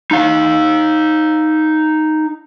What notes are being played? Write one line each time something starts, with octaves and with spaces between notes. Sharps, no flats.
D#4 F5